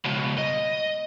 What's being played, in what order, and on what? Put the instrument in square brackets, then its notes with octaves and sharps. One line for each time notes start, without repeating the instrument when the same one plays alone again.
[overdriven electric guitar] C#2 B2
D#5